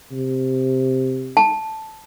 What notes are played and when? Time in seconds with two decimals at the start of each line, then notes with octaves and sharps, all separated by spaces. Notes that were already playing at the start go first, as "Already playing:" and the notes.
0.11 C3
1.37 A5